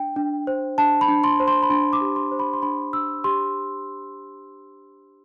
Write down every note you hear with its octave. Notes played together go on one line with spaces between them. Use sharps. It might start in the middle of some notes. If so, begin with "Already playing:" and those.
Already playing: D4 G5
D4
C5
D4 A5
B5
D4
C6
C5
C6
B5
D4 C6
D6
G4
C6
C5
B5
C6
D4 B5
D4 E6
G4 C6